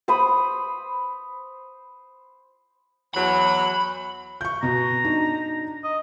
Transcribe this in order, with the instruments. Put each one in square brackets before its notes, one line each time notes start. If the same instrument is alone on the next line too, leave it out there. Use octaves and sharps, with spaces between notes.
[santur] C5 B5 D#6
[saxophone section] E2 F#3 [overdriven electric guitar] B5
[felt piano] C#6 G6
[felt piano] B2 [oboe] A#5
[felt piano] D4 D#4
[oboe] D#5